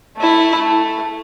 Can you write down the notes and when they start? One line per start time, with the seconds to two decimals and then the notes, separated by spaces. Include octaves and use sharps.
0.17 A3 E4
0.57 A3